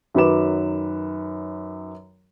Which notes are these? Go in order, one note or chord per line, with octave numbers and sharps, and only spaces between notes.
F#2 D#3 F#3 B4 D6 E7